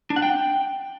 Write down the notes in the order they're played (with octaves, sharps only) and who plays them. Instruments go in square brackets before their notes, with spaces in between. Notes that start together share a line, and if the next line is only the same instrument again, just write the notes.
[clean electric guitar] D4
F#5
G5